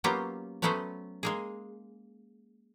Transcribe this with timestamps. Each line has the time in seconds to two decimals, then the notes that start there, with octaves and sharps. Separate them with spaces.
0.04 F#3 A#3 B3 C#4 F4 G4
0.62 F#3 A3 B3 C#4 B4 C5
1.23 G#3 A#3 G#4